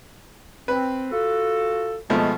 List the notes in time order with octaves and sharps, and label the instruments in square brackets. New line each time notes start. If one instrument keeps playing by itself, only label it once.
[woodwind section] C4 [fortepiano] B4
[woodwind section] F4 F#4 A4
[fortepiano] B2 F3 A3 [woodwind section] G#3 B3